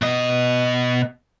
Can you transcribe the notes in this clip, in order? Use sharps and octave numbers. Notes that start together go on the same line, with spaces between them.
B2 D#5